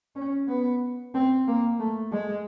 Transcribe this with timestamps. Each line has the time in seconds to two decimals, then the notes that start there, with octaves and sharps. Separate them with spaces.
0.15 C#4
0.48 B3
1.15 C4
1.48 A#3
1.79 A3
2.12 G#3